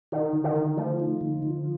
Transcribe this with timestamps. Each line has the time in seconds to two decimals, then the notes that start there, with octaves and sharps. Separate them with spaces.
0.12 D#3 D#4
0.33 D3
0.44 D#3
0.56 D3
0.77 F3 A3
1.00 D#4
1.21 D3
1.42 D3